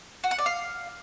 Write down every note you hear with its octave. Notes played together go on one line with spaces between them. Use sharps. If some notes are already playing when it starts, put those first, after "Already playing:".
F#4
F#5
D5
F5